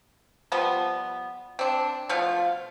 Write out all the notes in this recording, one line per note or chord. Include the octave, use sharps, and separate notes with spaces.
F3 G3 B3
C4 D4
B2 F3 A3 F4